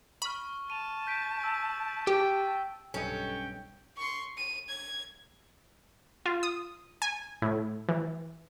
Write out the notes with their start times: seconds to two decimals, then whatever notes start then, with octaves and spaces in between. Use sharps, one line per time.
0.22 B5 C#6 F6
0.70 A5 D#7 F7
1.07 G6 B6 D7
1.44 E6
2.07 G4 G5
2.94 B1 G2 C#4 A4 D#5 G5
3.97 C6 C#6
4.37 D#7
4.68 G#6
6.26 F4
6.43 D#6
7.02 G#5
7.42 A2
7.89 E3